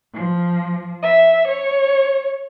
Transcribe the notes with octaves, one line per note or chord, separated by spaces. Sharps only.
F3
E5
C#5